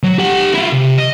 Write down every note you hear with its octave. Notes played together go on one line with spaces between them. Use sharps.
F#3
G4 F#5
E4 F4
C3
D#5